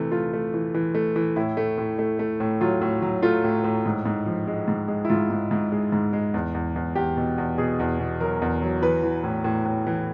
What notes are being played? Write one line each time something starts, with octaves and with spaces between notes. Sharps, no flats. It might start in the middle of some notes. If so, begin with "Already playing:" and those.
Already playing: C3 E3 A3
A3 F4
A3
E3
E3
A3
E3
A2 E4
A3
A2
A3
A3
A2
F#3 F4
A2
F#3
A3 F4
A2
A2
G#2
G#2
F3
G#3
G#2
G#3
E4
G#2 F4
G#2
G#2
G#3
G#2
G#3
E2
E2
E2
E2 G4
B2
E2
B2 G#4
E2
B2
F#3 A#4
E2
F#3
E3 B4
E3
A2
A2
A2
E3